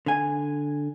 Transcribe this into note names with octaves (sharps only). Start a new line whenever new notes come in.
D3 G#5